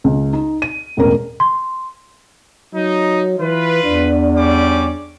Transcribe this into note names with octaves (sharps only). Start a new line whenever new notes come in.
C#2
D#4
D#7
E1 A1 A#4
C6
F#3 D#4
E3 F4 B4
E2 D4
G3 C#4 D6